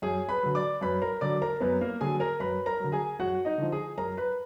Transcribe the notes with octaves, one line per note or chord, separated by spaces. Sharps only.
F#2 G#4 G#5
B4 B5
D3 F#3
D5 D6
F#2 B4 B5
A#4 A#5
D3 F#3 D5 D6
A#4 A#5
F#2 B3 B4
A#3 A#4
D3 F#3 G#4 G#5
A#4 A#5
F#2 B4 B5
A#4 A#5
D3 F#3
G#4 G#5
F#2 F#4 F#5
D#4 D#5
D3 F3
G#4 G#5
F#2 A#4 A#5
B4 B5